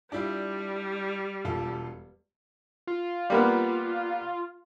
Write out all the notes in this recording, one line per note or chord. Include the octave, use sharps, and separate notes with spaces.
G3 D4 E4 F4
E1 F4 A4
F4
G3 A#3 B3